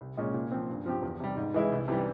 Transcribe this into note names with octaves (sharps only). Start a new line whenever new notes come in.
C2
A#2 G#3 C#4
A#2
F3 C4
G2
F3 C4 G4
E2
C3 G3
G#2
E3 G#3 E4
C2
C3 E3 G3